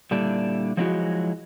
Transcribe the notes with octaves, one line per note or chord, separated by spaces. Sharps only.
A#2 D3 G3 D4 E4
F3 F#3 G#3 D#4 E4 F#4